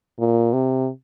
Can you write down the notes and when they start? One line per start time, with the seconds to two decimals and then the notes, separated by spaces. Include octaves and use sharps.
0.19 A#2
0.53 C3